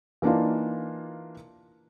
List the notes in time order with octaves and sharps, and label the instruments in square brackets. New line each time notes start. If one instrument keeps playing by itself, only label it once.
[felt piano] E3 A#3 D4 D#4 F4